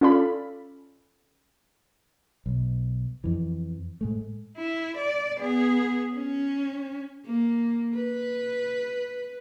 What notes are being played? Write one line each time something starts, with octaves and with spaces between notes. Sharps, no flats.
C#4 F4 A4 D5 F5 B5
B1
F2 E3
A2 G#3 A3
E4
D5
B3 G#4
C#4
A#3
B4